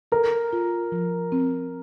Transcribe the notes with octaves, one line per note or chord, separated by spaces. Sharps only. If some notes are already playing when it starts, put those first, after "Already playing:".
A4 A#4
F4
F3
C4